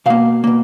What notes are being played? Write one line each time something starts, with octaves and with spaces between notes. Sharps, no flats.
B2 A#3 F5
B2 A#3